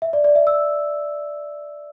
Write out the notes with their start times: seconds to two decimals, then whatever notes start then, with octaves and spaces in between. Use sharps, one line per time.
0.02 E5
0.13 D5
0.24 D5
0.36 E5
0.47 E6